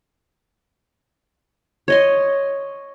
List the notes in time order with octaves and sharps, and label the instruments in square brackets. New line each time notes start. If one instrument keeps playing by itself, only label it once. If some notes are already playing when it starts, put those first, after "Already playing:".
[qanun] C#5 D#5 C6